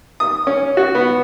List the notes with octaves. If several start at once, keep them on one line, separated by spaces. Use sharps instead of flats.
D#6
C#4
F#4
B3